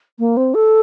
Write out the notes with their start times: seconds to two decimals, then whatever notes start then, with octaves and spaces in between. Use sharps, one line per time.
0.19 A#3
0.37 C4
0.54 A4